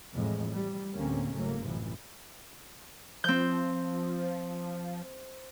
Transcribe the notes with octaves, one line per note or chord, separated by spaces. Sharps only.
F2 A2 E3 G#3
G3
A1 D2 D3 A#3 C4 C#4
F#1 G#2 F#3 A3 A#3
A1 F#2 C3 E3 F3
F3 C4 G6